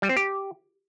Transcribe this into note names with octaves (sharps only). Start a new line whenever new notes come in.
G3
C4
G4